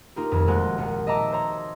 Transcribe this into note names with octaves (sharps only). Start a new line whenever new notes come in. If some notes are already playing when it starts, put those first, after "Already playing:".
A#3 D#4 F4 G4
D#1 F2
G#3 A3 F#4 C5 F5 F#5
A#1 C#7
D#5 E5 A5 A#5 D6 E6
C5 C#5 A#5